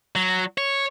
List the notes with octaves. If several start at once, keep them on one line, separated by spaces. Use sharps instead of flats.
F#3
C#5